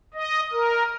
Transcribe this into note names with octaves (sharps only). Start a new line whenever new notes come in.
D#5
A#4